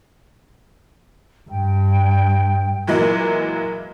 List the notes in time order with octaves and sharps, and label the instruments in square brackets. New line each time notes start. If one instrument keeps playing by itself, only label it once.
[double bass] G2 [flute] G5
[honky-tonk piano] A#2 E3 F#3 G#3 A#3